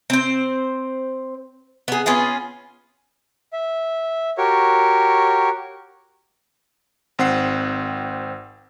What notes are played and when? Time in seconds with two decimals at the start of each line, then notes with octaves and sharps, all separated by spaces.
0.10 C4 C5
1.88 B3 G#4
2.06 B3 C#4 F4 G#4
3.53 E5
4.38 F#4 G4 A#4 C#5
7.19 G#1 C4 F#5 C7